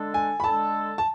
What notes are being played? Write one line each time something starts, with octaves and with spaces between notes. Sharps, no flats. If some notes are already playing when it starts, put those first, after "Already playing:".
Already playing: D3 G#3 D4 A4
G#5
B5
D3 G#3 D4 A4 A5
A5